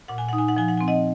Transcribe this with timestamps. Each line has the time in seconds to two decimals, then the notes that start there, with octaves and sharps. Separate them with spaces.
0.08 A#2 F#5
0.18 G#5
0.29 D#4 F#5
0.38 G#5
0.48 F#5
0.56 F3 G#5
0.68 F#5
0.78 C4 G#5
0.88 D#5 F#5